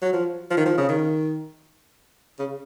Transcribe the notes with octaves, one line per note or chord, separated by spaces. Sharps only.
F#3
F3
F3
D#3
F3
C#3
D#3
C#3